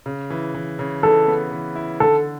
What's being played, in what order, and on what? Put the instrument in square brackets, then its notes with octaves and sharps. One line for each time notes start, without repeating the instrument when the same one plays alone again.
[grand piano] C#3
E3
E3
C#3
[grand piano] E3 [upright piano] A4
[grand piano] B3
E3
E4
[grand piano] D3 [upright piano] A4